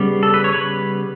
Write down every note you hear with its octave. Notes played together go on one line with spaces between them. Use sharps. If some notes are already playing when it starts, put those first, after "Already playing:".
Already playing: C#3 G3 B3
A4
B4
C#5
B4